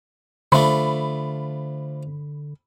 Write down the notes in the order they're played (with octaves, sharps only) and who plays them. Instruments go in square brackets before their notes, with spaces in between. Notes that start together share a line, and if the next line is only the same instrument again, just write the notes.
[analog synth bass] D3 [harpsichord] F3 A3 D4 [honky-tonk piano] B5